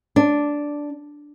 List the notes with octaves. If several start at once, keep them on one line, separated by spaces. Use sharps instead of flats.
D4